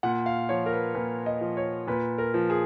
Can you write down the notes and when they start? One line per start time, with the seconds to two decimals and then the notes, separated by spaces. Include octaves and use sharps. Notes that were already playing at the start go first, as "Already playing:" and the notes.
0.03 A#2 F#5
0.26 F5
0.49 F3 C#5
0.66 A#4
0.73 B4
0.95 A#2 B4
1.26 D#5
1.41 F3
1.57 C#5
1.87 A#2 B4
2.18 A#4
2.34 F3
2.50 G#4